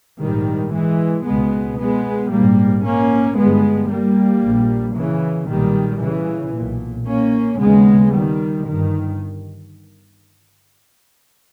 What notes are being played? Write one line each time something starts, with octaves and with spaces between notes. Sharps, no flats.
A#1 G#2 D#3 G3
E3 G#3
C#2 B2 G#3 B3
G#3 B3
A#1 G#2 G3 A#3
A#3 C#4
G1 G2 G#3 B3
G3 A#3
A#1 A#2
C#3 E3
B1 A#2 D#3 G3
C#3 E3
B1 A#2
A#3 C#4
D#2 C#3 G#3 B3
D#3 G3
G1 G2 D#3